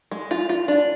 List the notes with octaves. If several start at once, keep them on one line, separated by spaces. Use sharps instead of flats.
G#3
F4
F4
D4